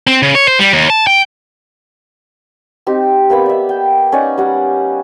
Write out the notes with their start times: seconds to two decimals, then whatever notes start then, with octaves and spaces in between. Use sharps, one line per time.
0.07 C4
0.22 C#3
0.35 C#5
0.48 C5
0.59 G3
0.73 D#2
0.90 A5
1.07 G5
2.87 C4 D#4 G4
3.30 A#3 B3 B5 D6
3.46 D5 E5
3.69 G5
4.12 C#4 D#4 D5 F#5
4.38 G3 F#5